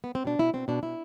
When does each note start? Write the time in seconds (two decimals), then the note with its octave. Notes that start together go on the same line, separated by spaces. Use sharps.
0.04 B3
0.15 C4
0.25 B2 D4
0.39 B2 E4
0.53 B2 C4
0.68 B2 D4
0.83 B2 E4